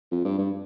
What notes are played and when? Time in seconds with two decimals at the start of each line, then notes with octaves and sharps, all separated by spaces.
0.11 F2
0.25 G2
0.38 G2